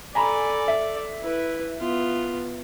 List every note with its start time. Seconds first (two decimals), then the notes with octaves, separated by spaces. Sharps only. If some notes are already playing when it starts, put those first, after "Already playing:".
0.15 A4 D5 G#5 A#5 B5
0.68 E5
1.22 E4 B4
1.80 B3 F4